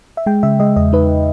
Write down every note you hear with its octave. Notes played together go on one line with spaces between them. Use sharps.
E5
G#3 G5
C#3 E5
G#3 D#5
E2 D#5
D#4 B4